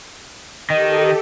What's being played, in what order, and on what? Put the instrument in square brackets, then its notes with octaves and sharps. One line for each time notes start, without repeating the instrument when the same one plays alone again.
[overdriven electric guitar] D#3 [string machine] G4 A4 [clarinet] D#5